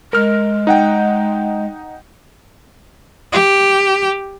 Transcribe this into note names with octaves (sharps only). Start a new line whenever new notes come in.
G#3 A#4 F6
D#4 F#5 G5
G4